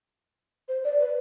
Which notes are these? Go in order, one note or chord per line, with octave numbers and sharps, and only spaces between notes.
C5
D5
B4